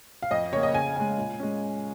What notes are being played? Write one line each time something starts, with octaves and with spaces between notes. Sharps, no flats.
F5
F2 D#5
C#3 A#3 C#5
D#5
C#3 G#5
G#3 C#4 G#5
A#2
G#3 C#4